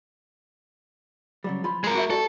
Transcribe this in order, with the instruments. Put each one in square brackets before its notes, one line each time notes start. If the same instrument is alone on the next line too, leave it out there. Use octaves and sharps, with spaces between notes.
[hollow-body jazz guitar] C#3 F#3 G3
F3 F4 B5
[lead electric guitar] G#3 A#4
[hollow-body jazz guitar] F#4 E5
[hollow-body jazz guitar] F#4 D5 [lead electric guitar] A4